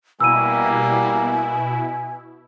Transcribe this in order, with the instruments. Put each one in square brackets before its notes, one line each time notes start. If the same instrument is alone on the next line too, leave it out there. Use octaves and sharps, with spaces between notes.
[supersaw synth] B2 E4 [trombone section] G3 A#3 [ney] G#5 [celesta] E6 D#7